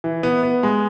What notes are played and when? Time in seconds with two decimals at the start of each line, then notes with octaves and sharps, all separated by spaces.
0.04 E3
0.23 B3
0.43 B3
0.63 G#3